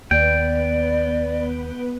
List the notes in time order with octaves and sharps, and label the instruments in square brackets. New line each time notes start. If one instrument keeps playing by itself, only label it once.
[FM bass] D#2 [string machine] B3 B4 [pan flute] D5 [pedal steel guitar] G5